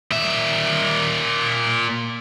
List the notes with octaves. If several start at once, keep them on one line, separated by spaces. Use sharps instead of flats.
A#2 E5